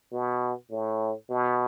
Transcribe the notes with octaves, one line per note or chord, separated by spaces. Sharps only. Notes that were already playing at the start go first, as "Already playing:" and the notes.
B2
A2
B2